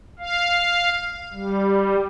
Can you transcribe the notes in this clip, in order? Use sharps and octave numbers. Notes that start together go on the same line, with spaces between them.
F5
G3